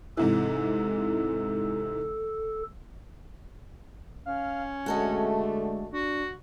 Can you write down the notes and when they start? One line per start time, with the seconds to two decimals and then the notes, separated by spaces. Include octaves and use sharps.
0.17 G#2 C3 E3 A4
4.26 C#4 F5
4.86 D3 G#3 A3 F#4 A4 D#5
5.92 D4 F#4